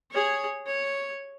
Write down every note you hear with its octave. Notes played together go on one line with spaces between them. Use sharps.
G#4 C#5
C#5